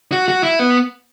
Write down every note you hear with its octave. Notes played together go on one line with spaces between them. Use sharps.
F#4
F#4
E4
B3